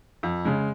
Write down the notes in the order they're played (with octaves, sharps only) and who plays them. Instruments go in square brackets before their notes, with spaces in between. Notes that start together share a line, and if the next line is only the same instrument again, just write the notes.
[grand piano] F2
C#3 G#3